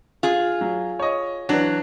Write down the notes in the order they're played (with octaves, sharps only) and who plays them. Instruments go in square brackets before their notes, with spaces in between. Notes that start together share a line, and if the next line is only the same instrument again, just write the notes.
[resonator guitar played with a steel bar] F4 G#4
[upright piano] F#3
C#5 D#5
[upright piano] E3 D4 [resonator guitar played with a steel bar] F#3